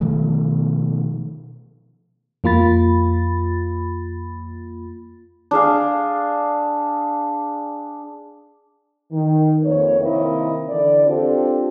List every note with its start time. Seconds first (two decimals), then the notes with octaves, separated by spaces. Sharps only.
0.01 B2 D#3 F3 A3
2.44 F2 A#3 F4 B5 A6
5.51 D4 G#4 F5
9.11 D#3
9.63 F2 A#3 B4 C#5
10.01 C3 D#3 A#3 E4 D#5
10.69 D3 E3 D5
11.05 C4 D4 F4 G4 A4